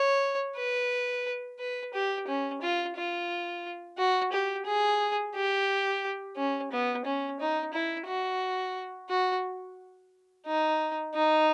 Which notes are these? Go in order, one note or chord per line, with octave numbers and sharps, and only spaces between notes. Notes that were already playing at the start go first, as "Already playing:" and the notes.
Already playing: C#5
B4
B4
G4
C#4
F4
F4
F#4
G4
G#4
G4
C#4
B3
C#4
D#4
E4
F#4
F#4
D#4
D#4